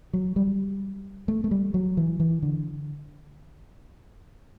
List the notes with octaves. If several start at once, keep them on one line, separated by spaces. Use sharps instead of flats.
F#3
G3
A3
A3
G3
F#3
E3
E3
D3